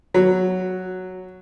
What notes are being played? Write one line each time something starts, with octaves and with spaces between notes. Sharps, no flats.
F#3